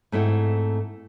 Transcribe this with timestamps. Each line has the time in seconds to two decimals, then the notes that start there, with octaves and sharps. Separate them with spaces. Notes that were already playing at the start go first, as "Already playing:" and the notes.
0.12 G#2 A3 C4 E4 F#5